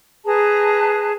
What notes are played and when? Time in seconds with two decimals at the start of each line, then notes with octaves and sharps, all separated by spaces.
0.25 G#4 B4 A5 A#5